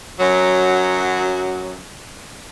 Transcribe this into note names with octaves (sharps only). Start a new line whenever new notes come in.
F#2 F#3